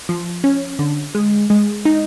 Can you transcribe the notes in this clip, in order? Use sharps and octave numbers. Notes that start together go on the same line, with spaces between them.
F3
C#4
D3
G#3
G#3
D#4